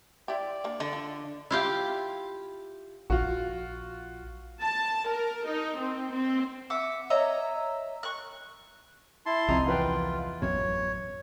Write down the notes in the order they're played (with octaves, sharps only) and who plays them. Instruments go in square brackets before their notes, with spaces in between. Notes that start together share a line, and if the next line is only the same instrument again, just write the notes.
[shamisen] E4 G4 [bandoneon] D5
[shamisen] A#3 D4
[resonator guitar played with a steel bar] D3 [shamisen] D#5
[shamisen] F4
[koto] E4 F4 G4
[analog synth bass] A#1 [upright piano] F4 F#4
[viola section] A5
A#4
D#4
C4
C4
[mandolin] E5 F#5 D6
C#5 D#5 E5 A#5
C#6 F#6
[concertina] E4 A5 C6
[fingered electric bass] C2 F3 [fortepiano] C4 D#5 A#5
[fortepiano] E2 B4 G5 [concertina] F4
[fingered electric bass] A1 F#2 B2 [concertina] C#5